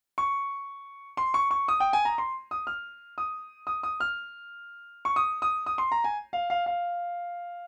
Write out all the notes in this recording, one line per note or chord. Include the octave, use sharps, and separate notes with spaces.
C#6
C6
C#6
C#6
D#6
G5
G#5
A#5
C6
D#6
F6
D#6
D#6
D#6
F6
C#6
D#6
D#6
D#6
C6
A#5
G#5
F5
F5
F5